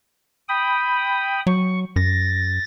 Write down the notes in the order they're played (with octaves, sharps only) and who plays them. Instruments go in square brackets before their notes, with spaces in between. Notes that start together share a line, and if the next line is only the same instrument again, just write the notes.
[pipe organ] G5 B5 D#6
[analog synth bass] F#3 [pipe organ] C#6
[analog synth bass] F#2 [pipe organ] A6 A#6